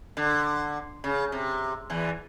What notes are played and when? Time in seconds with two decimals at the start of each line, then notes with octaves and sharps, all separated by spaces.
0.17 D3
1.04 C#3
1.32 C3
1.90 E2 E3